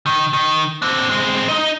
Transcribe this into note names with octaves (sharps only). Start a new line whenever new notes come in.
D#3
D#3
C4 D4
G#3 C4
D#4 D#5